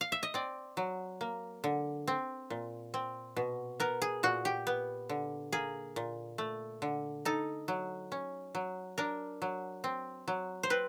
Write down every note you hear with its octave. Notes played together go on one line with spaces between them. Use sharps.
F5
E5
D#5
C4 D5
F#3
A#3
D3
C4
A#2
C4
B2
B3 A#4
G#4
A#2 F#4
G4
B3
D3
A#3 G#4
A#2
A3
D3
D#4 A4
F#3
C#4
F#3
D4 A#4
F#3
C4
F#3
C5
C4 B4